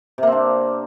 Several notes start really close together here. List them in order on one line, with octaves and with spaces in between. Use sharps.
C3 A#3 C4 D4